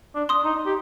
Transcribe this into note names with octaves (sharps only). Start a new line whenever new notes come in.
D4
C6 D#6
D#4
G4